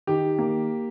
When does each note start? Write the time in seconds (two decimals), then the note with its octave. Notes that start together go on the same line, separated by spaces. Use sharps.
0.07 D#3 G4
0.38 A#3